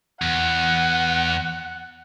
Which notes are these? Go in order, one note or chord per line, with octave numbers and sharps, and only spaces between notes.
E2 F#5